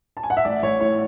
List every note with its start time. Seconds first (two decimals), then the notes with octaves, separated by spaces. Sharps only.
0.17 A5
0.23 G#5
0.30 F#5
0.37 E5
0.45 A1 D5
0.63 A1 C#5
0.80 A2 C#5